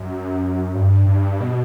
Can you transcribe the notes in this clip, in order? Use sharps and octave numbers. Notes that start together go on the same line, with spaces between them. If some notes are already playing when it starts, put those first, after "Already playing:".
Already playing: F#2
G2
G2
B2